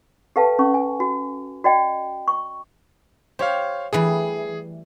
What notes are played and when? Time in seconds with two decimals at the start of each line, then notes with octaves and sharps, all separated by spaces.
0.36 G4 A4 B4 F5 G5 A5
0.59 C#4 C#6
0.74 G#5
1.00 F#4
1.64 F#4 D5 D#5 G5
2.28 C#6
3.39 G4 C5 C#5 F5
3.93 E3 G3 A3 G#4